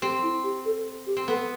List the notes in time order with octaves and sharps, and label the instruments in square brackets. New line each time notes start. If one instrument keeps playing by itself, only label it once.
[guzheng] C4 [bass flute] G4
[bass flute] E4
G4
A4
G4
[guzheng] C4
[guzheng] B3 [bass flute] A4